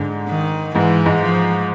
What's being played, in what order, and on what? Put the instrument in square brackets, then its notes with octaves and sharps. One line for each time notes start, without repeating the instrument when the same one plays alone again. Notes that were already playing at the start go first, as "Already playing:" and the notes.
Already playing: [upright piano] G#2 G#3 [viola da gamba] D3
[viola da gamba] D#3
[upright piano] G#2 G#3 [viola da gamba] E3
[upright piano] G#2 G#3
[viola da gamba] F3